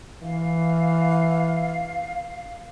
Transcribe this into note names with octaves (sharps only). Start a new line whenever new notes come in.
E3 F5